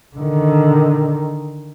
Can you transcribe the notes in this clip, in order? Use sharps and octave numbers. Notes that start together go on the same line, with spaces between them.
D3 D#3